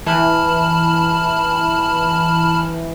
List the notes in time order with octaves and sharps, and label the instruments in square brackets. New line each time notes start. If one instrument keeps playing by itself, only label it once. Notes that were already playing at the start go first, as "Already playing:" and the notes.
[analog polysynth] E3 [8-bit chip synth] A5 B5 F6